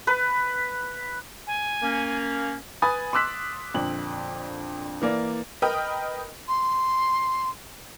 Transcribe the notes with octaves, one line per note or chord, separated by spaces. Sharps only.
B4
G#5
A#3 C#4
B4 G#5 B5 D#6 A6
C6 D6 E6 F#6 B6
F2 A#2 D3 F#7
E3 A#3 D5
A#4 B4 D#5 G5 D#6 F6
C6